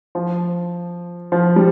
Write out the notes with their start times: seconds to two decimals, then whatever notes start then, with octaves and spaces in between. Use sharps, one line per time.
0.15 F3
1.32 F3
1.56 G3